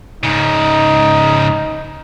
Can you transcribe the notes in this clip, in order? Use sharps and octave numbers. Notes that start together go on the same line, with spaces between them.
G#2 C#3 D#4